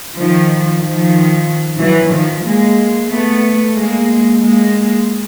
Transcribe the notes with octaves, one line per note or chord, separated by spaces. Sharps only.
D#3 F3
D#3 F3
E3 F#3
D#3 F3
G#3 A#3
A3 B3
G#3 A#3
G#3 A#3